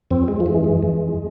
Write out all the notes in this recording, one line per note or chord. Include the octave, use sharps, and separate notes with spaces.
F2 C4
G#3
F3
E3 G#3
G#3
F2